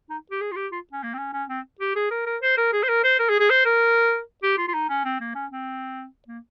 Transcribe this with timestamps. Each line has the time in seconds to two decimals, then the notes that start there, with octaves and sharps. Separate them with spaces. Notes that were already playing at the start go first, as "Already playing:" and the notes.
0.10 D#4
0.31 G4
0.41 G#4
0.52 F4
0.56 G4
0.72 F4
0.93 C#4
1.03 A#3
1.14 C4
1.18 C#4
1.33 C#4
1.49 C4
1.80 G4
1.95 G#4
2.11 A#4
2.26 A#4
2.42 C5
2.57 A#4
2.73 G#4
2.83 C5
2.88 A#4
3.04 C5
3.19 A#4
3.29 G#4
3.39 G#4
3.50 C5
3.65 A#4
4.43 G4
4.58 F4
4.68 F4
4.74 D#4
4.89 C#4
5.05 C4
5.20 A#3
5.35 C#4
5.52 C4
6.28 A#3